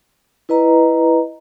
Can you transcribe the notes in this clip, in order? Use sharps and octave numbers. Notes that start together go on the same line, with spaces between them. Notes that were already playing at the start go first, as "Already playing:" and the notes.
E4 B4 D#5 A#5